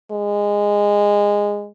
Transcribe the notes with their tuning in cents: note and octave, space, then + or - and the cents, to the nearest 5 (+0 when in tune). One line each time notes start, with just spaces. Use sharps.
G#3 -15